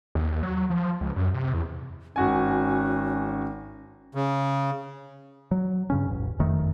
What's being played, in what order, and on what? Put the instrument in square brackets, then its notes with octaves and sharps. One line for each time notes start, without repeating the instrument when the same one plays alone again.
[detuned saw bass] D#2
F#3
F3
C#2
F#2
C3
E2
[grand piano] G#1 F#4 G#5 [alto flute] C#4
[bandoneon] C#3
[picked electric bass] F#3
G2 C#3 C#4
E1 A1
F#1 F2 D#3 A3